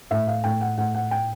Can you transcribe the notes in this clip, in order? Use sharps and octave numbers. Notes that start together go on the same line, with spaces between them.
A2 E5
F5
A2 G5
F#5
A2 F#5
F#5
G5